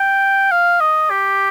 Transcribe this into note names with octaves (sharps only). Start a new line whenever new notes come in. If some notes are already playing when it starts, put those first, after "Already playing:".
Already playing: G5
F5
D#5
G4